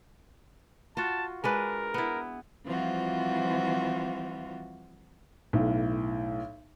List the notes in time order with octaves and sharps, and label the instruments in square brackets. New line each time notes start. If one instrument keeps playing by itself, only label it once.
[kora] F4 F#4 [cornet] A5
[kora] G#3 D4 B4 [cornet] A#4
[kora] B3 E4
[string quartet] E3 F3 G3 C4 F4 F#4
[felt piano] B1 A2